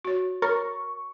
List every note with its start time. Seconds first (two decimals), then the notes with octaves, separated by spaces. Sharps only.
0.05 F#4 C#5
0.42 A#4 C#5 C#6